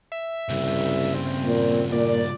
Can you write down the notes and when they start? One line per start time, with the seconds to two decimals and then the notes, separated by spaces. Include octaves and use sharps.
0.12 E5
0.50 C2 G2 C#3
1.14 C4
1.45 A#2
1.92 A#2 D5